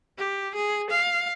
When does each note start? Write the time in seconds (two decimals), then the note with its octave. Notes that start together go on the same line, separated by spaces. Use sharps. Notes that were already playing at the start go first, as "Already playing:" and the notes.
0.18 G4
0.55 G#4
0.90 F5